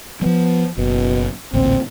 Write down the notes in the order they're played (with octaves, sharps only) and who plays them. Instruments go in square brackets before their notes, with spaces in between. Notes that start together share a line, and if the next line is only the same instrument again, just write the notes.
[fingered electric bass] F3 F#3 [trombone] B3
[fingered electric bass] F#1 [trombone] B2
[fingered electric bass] A1 D2 A#2 [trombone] C4